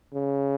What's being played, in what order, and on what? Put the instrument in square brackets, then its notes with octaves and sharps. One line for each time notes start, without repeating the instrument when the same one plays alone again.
[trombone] C#3